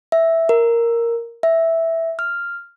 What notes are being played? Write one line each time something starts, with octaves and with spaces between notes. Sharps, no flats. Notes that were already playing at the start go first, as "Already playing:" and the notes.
E5
A#4
E5
F6